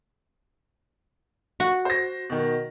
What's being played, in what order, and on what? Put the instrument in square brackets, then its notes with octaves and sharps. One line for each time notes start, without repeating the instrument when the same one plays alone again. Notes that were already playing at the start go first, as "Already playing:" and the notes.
[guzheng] F#4
[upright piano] C5 A#6
B2 D#3